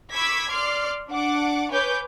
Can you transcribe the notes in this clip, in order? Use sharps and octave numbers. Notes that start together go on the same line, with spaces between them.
B5 C#6 D6 E6 G#6 B6
D5 C6 D6 F6 C7
D4 F#5 D6
B4 C#5 G#5 D6 G6